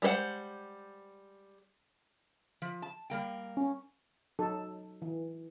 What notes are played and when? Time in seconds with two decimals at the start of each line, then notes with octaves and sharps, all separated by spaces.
0.02 G3 G#3 B4 C5 F#5
2.62 F3
2.82 A5
3.10 G3 A#3 G5
3.57 C#4
4.39 F#3 D#4 A4
5.02 E3